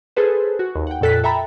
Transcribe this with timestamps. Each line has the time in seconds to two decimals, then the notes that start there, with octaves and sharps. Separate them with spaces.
0.16 G#4 A4 B4 C5
0.59 F#4
0.76 D#2
0.87 F#5 G5
1.01 F2 A#2 A4 F#6 B6
1.24 A4 E5 G5 A#5 B5